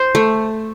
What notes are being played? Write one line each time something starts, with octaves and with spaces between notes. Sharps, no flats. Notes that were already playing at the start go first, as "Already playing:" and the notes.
Already playing: C5
A3